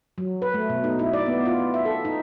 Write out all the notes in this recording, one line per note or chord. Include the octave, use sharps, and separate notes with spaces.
F#3
B4
A3
B2
D#4
E4
D5
B3
F4
E5
A4
D#4